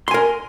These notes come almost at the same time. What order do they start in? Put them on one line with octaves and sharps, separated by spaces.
C6 G#5 A#4